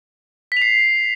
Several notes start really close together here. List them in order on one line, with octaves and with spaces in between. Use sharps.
B6 F7 C7